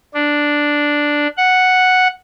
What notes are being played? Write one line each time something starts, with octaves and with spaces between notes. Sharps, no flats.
D4
F#5